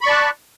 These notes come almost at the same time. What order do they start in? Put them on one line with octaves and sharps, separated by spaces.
B5 C#6 D5 A5 F#6